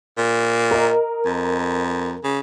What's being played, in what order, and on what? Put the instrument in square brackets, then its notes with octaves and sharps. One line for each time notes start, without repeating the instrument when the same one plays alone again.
[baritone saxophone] A#2
[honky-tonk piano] A#4 D#5
[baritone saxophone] F2
C#3